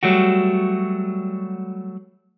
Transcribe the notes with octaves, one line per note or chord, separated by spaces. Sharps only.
F#3 G3 A3 F#4